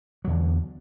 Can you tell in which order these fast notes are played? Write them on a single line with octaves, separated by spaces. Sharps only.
F#3 E2 D3